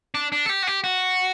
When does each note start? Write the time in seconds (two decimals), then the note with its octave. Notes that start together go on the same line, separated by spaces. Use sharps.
0.15 D4
0.32 D4
0.46 A4
0.49 G4
0.63 F#4
0.67 G4
0.84 F#4